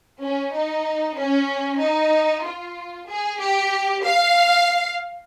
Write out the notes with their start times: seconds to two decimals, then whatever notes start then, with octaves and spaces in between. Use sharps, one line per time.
0.23 C#4
0.54 D#4
1.18 C#4
1.82 D#4
2.45 F4
3.10 G#4
3.40 G4
4.05 F5